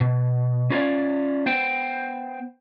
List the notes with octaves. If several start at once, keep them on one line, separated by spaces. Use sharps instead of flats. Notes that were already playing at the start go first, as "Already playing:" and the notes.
B2
C#4 F4 A#4 B4 C#5 D5
B3 C5 G5